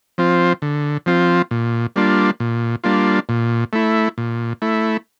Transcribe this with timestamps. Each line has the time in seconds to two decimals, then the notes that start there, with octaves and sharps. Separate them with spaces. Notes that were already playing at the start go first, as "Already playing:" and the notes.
0.18 F3 C4 F4
0.62 D3
1.06 F3 C4 F4
1.51 A#2
1.96 G3 A#3 D4 F4
2.40 A#2
2.84 G3 A#3 D4 F4
3.29 A#2
3.73 A3 E4
4.18 A#2
4.62 A3 E4